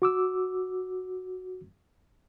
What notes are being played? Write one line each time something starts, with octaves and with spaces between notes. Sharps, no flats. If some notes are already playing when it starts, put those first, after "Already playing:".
F#4 D6 E6